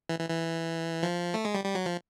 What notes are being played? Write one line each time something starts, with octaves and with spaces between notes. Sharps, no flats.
E3
E3
E3
F3
A3
G#3
G3
G3
F#3
F3